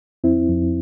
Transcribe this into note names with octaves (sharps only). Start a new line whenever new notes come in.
F2 C4 E4
F2